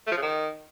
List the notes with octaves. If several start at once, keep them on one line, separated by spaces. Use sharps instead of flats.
A3
F3
C#3
D#3